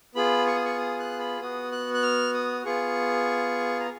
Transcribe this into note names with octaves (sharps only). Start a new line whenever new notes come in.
B3 F4 G#4 B5
C#6
D#6
C#6
D#6
F#6
B5
B3 F#4 D#6
F#6
F#6
F6
D#6
B3 F4 G#4 C#6
A#5